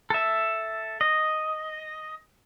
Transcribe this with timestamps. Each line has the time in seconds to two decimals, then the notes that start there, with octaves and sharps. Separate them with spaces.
0.10 A4 E5
1.01 D#5